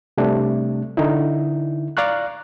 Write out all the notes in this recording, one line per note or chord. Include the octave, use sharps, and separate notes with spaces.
C3 G3 A3 D4
D3 D#4 E4
D5 F5 A#5 C#6 F#6